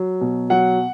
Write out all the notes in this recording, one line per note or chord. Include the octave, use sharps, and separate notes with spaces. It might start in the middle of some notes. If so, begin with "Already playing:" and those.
Already playing: F#3
B2
F#3 F#5